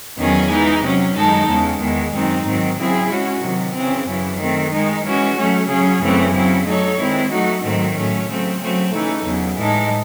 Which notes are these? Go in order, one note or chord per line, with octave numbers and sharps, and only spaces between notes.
E2 D#3 F#3 C#4 G#4
E3 G#3 D#4
C3 F#3 C#4
F#2 D#3 G#3 D#4 A4
E2 C#3 G#3
E2 D#3 G#3
F#2 D#3 G#3 C4 D#4
G#2 D#3 F#3 C4
C#3 F#3 C4 E4 G#4
G#3 C#4 F#4
C3 D#3 F#3
C#3 E3 C4
F#2 C#3 E3
D#3 A3 C4
D#3 G#3 D#4
E3 G#3 C#4 F#4
F#3 A3 C#4
C#3 F#3 C#4 G#4
F#2 C#3 E3 A3 C4
C#3 F#3 C4 E4
F#3 A3 D#4 A4 C#5
D#3 G#3 C4 E4
F#3 A3 D#4 F#4
G#2 D#3 F#3 A3 C4
A2 F#3 A3 C#4
C#3 F#3 A3 C4
C#3 F#3 A3 C4
C#3 E3 A3 D#4 A4
E2 C#3 F#3
A2 E3 G#3 D#4 A4